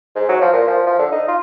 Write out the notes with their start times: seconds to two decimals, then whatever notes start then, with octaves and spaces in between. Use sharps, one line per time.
0.16 G#2
0.29 F#3
0.41 F3
0.53 A#2
0.67 F3
0.87 F3
0.99 D3
1.12 D#4
1.28 F4